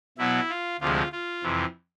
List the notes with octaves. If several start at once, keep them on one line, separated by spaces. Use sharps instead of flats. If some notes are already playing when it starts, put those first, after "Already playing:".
B2 F#3 B3 E4
F4
D2 C3 F3 G#3 F4
F4
F2 C3 E3